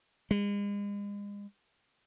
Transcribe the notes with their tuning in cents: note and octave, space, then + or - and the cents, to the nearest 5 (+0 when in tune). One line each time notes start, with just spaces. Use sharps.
G#3 -40